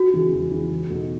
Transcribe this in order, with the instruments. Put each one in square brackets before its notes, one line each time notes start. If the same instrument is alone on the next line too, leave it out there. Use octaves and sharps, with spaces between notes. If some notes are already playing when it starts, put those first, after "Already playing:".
Already playing: [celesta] F#4
[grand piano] C#3 E3
E2
C#3 E3
E2
B2 A3 D#4 F#4